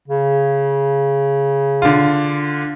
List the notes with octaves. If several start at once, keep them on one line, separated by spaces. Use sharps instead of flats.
C#3
D3 F4